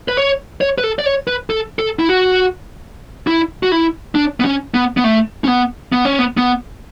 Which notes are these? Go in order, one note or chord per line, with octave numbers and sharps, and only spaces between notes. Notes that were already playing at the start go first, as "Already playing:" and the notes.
B4
C#5
C#5
B4
A4
D5
C#5
B4
A4
A4
E4
F#4
E4
F#4
E4
D4
B3
C#4
B3
B3
A3
C#4
B3
B3
C#4
B3
B3